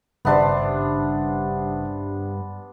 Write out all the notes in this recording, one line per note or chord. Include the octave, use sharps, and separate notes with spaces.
G#1 G2 C#3 B3 D4 C5 E5